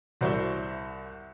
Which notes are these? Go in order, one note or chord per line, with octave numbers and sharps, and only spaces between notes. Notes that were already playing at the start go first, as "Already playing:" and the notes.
C2 F#4 C5 D5 E5 G6